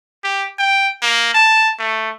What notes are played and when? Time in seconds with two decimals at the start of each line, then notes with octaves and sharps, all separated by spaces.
0.24 G4
0.59 G5
1.02 A#3
1.34 A5
1.79 A3